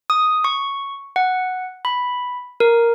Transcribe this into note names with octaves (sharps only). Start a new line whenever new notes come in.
D#6
C#6
F#5
B5
A#4